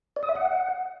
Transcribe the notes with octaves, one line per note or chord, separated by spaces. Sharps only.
D5
D#6
E5
F#5